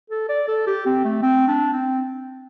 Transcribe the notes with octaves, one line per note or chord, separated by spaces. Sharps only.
A4
D5
A4
G4
C4
A3
C4
D4
C4